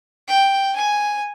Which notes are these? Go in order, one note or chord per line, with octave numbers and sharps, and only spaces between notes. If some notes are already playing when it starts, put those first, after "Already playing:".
G5
G#5